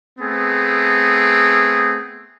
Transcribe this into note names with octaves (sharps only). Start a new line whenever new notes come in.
A3 B3 C4 G#4